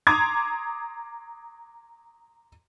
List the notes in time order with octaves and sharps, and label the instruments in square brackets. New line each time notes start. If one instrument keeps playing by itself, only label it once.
[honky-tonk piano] A#5 C6 D6 D#6 G#6